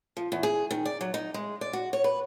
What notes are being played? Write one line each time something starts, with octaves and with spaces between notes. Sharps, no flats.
F3
E2
G#4
D#3
D5
F#3
D#4
G#3
D5
F#4
C#5
B4